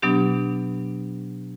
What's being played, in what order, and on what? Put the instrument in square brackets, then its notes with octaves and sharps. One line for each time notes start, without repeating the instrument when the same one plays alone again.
[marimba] B2 F#3 B3 D4 G4